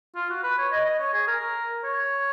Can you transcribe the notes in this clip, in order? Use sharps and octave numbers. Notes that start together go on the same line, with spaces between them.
F4
F#4
B4
C#5
D#5
D#5
C#5
G#4
A#4
C#5